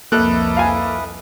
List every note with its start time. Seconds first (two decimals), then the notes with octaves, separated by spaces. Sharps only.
0.12 C2 F2 A#3 E4 A4 B4 D#5 F#6
0.57 F5 G#5